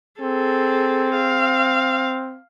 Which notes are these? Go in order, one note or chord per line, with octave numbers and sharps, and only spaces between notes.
C4 G#4 A4
F5